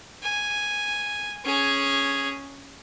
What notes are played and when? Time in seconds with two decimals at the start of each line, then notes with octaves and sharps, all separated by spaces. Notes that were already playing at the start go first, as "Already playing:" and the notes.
0.23 G#5
1.45 C#4 G#4